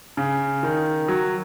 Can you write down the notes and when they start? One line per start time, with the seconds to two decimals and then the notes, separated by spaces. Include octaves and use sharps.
0.17 C#3
0.63 D#3
1.08 F#3